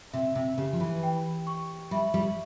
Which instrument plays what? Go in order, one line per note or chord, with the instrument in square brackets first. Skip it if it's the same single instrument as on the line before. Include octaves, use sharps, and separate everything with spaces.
[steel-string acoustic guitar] C3 [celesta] E5
[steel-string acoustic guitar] C3
[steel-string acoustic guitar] C#3 [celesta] G4
[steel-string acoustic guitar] F3
E3
[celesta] G5
C#6
[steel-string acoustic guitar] G3 [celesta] E5
[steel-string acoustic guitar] G3